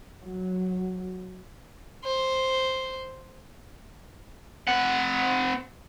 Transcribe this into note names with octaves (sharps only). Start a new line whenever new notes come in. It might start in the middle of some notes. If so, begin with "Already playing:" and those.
F#3
C5
C4 F#5